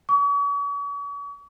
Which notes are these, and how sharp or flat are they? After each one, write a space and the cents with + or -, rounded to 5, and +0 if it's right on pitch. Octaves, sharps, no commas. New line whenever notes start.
C#6 +45